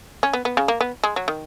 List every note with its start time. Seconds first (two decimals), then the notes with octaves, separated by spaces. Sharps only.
0.23 C#4
0.33 B3
0.45 B3
0.57 C#3
0.68 A#3
0.81 B3
1.04 G#3
1.16 F#3
1.28 D#3